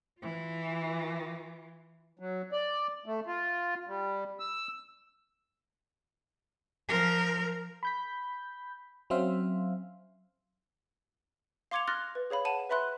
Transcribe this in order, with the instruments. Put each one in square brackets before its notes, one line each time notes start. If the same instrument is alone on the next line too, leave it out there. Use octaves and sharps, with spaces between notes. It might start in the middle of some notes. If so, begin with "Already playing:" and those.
[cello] E3 F4
[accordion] F#3
D5
A3
F4
G3
E6
[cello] F3 A#4
[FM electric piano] B5 G6 B6
F#3 C4 C#4 C5 E5 F5
[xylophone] F5 C6 D6 G#6 C#7 F7
C6 F6 F#6 A6 A#6
B4
G#4 C#5 F5 B5
F#5 A5 D#7 E7
B4 E5 B5 C6 F#6